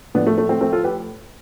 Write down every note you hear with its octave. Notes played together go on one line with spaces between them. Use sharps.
A2 F3 B3 D4
A3
A3
A3 C4
A3 C4
F4 A4
G4 B4